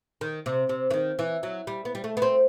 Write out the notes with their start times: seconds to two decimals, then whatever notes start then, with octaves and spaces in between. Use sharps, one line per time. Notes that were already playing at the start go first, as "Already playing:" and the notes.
0.21 D#3
0.46 C3
0.69 C3
0.91 E3
0.94 D#3
1.19 E3
1.43 F#3
1.67 G3
1.85 B3
1.95 G3
2.04 A3
2.17 B3
2.22 C4